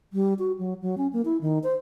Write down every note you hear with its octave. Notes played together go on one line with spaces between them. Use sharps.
G3
F#4
F#3
F#3
C#4
A#3
E4
D#3
C5